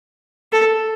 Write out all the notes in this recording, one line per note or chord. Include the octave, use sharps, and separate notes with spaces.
A4